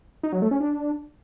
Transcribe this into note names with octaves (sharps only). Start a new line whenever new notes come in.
D#4
F#3
A3
C#4
D4